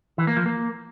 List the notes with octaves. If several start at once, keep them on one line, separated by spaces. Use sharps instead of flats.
E3
A#3
F3
A#3